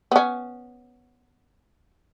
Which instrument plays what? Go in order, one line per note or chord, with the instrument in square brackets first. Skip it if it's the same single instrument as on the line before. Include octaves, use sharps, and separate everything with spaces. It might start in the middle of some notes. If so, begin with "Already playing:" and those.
[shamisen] B3 C#4